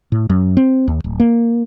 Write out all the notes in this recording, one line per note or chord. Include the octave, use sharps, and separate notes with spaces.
A2
F#2
C4
D#2
D1
A#3